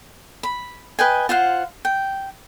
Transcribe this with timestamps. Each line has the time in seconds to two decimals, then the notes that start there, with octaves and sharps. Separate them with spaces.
0.43 B5
0.99 B4 D#5 G5 G#5
1.29 F4 C5 F5 F#5
1.85 G5